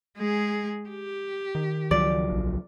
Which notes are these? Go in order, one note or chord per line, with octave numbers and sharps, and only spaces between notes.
G#3 G#4
G4
D#3
C#2 F3 F#3 D5
A#1